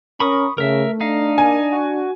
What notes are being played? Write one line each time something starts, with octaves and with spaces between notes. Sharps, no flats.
C#4 A#4 B5 C#6 D#6
C#3 A3 A#4 E5
D4 D#4 F5
A#3 G#5
F#4